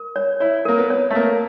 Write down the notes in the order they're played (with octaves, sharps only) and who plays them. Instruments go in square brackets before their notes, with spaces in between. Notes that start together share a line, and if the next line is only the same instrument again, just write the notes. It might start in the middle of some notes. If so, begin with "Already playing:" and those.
Already playing: [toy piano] A#4
C#5
[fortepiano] E4 [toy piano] C#5
[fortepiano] A#3 [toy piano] A#4
[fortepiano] B3
[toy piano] C#5
[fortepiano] A3
[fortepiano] A#3 [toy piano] A#4